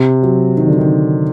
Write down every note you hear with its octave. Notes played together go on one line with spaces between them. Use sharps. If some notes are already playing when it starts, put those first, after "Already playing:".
Already playing: C3
F#3
D#3
D3
D#3